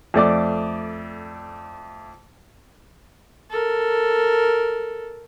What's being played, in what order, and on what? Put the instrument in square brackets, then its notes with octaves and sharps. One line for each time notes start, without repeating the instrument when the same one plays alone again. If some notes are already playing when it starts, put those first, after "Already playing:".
[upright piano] F2 A3 D5 D6
[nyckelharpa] A4 A#4